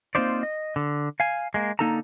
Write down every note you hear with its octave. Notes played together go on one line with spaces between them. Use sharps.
A#3 C4 D#4 F4 C5 D5
D#5
D3
F5 G#5
G#3 A#3
D3 A#3 D#4 A4 A5 A#5